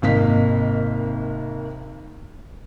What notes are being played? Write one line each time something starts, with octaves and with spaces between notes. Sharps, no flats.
G#1 C3 A#3 D#5 F5 B6